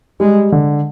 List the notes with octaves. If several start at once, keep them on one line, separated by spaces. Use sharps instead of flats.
G3 G#3
D3